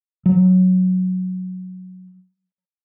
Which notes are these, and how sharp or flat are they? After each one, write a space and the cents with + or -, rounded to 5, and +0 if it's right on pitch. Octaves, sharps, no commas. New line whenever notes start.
F#3 -5